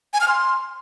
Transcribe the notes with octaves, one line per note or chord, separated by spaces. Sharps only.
G#5
F6
C6